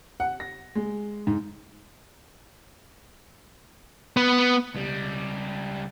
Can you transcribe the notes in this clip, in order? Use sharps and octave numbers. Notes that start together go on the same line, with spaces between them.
F#5
A#6
G#3
G#2
B3
C#2 G3